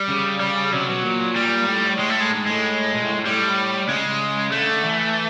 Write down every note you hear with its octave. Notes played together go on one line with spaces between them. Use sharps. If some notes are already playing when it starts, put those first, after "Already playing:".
Already playing: G3
C#3
G3
C3 F#3
B2
A#2
G3
A2
G#3
A3
G#3
G#2
A2 G#3
A#2
A2
A2
A2 G3
C#3 G#3
D3 A3
E3